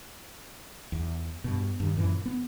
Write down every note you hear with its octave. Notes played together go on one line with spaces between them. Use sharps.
E2
G2 B2
G2 D#3
F#2 A#2 E3
B3